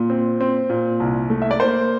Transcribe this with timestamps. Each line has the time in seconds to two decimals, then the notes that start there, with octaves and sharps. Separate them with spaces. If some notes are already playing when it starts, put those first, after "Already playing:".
Already playing: A#2
0.10 C4
0.40 C4
0.70 A#2
1.00 C2
1.30 A3
1.42 E5
1.51 D5
1.60 A#3 C5